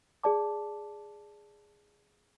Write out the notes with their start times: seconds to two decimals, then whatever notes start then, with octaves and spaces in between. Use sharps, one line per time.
0.24 G#4 D5 A5 D6